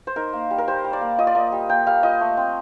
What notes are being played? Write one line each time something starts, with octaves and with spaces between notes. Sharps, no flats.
C5
D#4 A#4
A#3
G3
A#4
G3 C5
G3
D5
A#3
F4 D#5
D5
A#3 D#5
G3
A#3 G5
G3 F5
F4 D#5
A3
C4